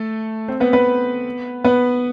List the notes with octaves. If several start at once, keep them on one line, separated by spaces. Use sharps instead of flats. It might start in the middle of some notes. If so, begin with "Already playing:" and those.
Already playing: A3 A4
C4 C5
B3 B4
B3 B4
B3 B4